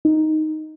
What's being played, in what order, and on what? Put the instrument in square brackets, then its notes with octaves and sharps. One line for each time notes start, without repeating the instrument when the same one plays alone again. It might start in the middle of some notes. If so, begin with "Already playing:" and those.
[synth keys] D#4